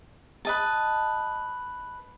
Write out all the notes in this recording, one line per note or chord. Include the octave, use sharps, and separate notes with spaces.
B4 D#5 A5